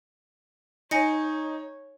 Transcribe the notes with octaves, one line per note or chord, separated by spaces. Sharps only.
D#4 C#5 G#5 A#6 C#7